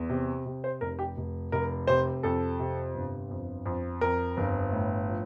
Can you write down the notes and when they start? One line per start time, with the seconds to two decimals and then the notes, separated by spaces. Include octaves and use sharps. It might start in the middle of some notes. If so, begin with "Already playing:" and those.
Already playing: E2
0.09 C3
0.46 C3
0.64 C5
0.81 F1 A#4
0.99 G4
1.17 F1
1.52 F1 A#4
1.87 C3 C5
2.23 F2 A4
2.59 C3
2.95 G1
3.31 F2
3.66 F2
4.01 F2 A#4
4.37 G1
4.72 A2
5.09 F3